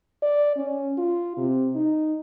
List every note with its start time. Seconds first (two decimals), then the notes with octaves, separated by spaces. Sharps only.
0.23 D5
0.57 C#4
0.98 F4
1.37 C3
1.75 D#4